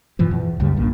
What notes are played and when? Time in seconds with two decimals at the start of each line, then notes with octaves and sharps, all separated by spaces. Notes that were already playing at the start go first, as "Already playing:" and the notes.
0.19 G2 B2 E3 F3
0.31 E2
0.60 C#2 F#2 C#3 G3
0.76 A#1 G2 A#2 D3